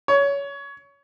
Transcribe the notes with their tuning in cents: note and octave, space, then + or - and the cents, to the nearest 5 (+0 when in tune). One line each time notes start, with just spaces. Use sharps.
C#5 +20